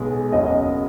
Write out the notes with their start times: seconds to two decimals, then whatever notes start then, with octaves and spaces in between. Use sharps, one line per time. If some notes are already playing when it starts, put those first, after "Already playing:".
Already playing: B1 B2 G#3
0.32 F#1 F#2 C#3 F#3 C#4 D#5